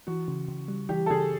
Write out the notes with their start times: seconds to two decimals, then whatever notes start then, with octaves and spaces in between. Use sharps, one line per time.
0.07 E3 F#4
0.28 C#3
0.48 C#3
0.68 G3
0.89 E3 G4
1.06 A4
1.10 C#3 G#4